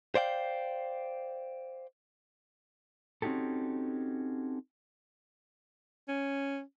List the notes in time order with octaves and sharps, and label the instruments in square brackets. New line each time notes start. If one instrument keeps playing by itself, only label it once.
[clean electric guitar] C5 D5 F5 G5
[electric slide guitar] C4 C#4 D#4 F#4 G4 A4
[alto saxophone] C#4